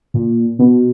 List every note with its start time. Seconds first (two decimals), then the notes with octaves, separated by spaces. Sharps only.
0.14 A#2
0.59 B2